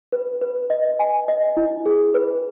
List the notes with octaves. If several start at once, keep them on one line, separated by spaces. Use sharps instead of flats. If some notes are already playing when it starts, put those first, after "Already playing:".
B4
B4
D#5
G#5
D#5
E4
G#4
B4